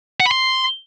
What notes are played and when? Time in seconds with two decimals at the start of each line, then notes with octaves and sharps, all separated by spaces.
0.20 F#5
0.26 B5
0.31 C6